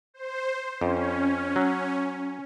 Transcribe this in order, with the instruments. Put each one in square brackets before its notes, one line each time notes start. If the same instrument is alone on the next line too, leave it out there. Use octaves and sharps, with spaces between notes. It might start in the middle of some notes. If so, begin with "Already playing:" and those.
[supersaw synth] C5
[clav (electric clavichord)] F2 [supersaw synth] C#4
[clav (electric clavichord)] F#3